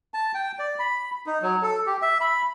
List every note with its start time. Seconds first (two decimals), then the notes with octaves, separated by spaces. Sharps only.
0.14 A5
0.34 G5
0.59 D5
0.79 B5
1.27 D#4
1.42 F#3
1.63 A4
1.86 G4
2.02 E5
2.21 B5